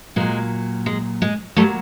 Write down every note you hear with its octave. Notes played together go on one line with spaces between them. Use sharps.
A#2 F#3 G#3
G#3
G#3
A#2 F#3 G3 A3